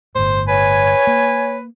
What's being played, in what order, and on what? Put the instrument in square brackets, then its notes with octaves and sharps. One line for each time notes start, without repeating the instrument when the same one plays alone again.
[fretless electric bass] G1 A2 [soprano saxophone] C5
[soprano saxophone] B4 [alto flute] C#5 [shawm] G#5
[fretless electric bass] A#3